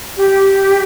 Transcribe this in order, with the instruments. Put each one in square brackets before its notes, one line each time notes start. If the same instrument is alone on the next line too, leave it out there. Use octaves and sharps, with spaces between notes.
[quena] G4